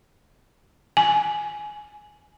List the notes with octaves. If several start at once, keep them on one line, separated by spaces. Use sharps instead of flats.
G#5